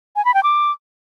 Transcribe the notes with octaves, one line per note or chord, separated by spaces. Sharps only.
G#5
B5
G5
D6